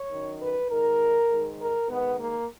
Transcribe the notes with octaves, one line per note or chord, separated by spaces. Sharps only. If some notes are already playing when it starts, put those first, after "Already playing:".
Already playing: C#5
F#2 D#3
B4
G#2 D#3 A#4
G#2 D#3
A#4
G#2 D#3 B3
A#3